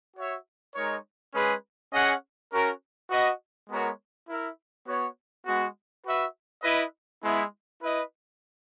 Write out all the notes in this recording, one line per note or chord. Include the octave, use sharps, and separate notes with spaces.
F#4 C#5 E5
G#3 D#4 A#4 C#5
G#3 C#4 G#4 B4
C#4 G#4 D#5 F#5
C#4 F#4 A#4
F#4 B4 D#5 F#5
G#3 B3 F#4 A#4 C#5
E4 A#4 E5
B3 F#4 C#5
G#3 B3 F#4
F#4 B4 E5
E4 B4 D#5
G#3 B3 E4
E4 B4 D#5